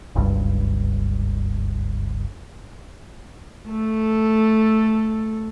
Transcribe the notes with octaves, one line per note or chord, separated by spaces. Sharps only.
F#1 C#2 G2
A3 A4